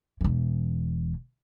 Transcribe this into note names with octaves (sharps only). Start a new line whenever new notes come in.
E1 E3